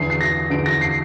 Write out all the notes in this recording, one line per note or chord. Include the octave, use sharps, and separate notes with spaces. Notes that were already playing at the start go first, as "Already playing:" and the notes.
Already playing: E2 D3 C7
C7
A#6
E2 D3 D7
A#6
C7